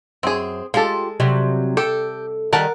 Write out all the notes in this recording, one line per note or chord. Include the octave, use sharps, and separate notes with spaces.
F#2 C4 G#4
G#3 F4 G4 A4
C3 F#3 G3
G4 A4
D#3 G3 A#4 F#5 A5